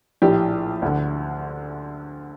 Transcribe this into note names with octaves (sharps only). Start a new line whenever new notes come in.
A#1 A2 G4
D2 D3